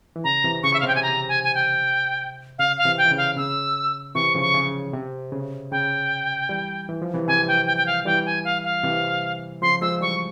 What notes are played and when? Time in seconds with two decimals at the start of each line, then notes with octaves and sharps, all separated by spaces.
0.16 E3
0.24 C#3 A#5
0.44 C3 E3
0.63 C#3 C#6
0.74 E5
0.80 F5
0.83 C3 G5
0.95 G#5
1.03 A#5
1.28 G#5
1.44 G#5
1.55 G5
2.59 C#3 F5
2.78 F5
2.85 C3 E3
2.98 G5
3.05 E3
3.11 C#3
3.17 F5
3.37 C#3 E6
4.15 C3 E3 C#6
4.35 C#3 F3
4.41 C#6
4.54 C#3
4.93 C3
5.32 C#3
5.72 C#3 G5
6.49 E3 G3
6.89 E3
7.02 F3
7.14 C3 E3
7.28 C3 E3 G#5
7.48 G5
7.67 G5
7.77 G5
7.86 F5
8.06 E3 G3 G5
8.26 G#5
8.45 F5
8.64 F5
8.84 C3 E3
9.62 C#3 F3 C6
9.81 F3 G#3 E6
10.01 E3 G3 C#6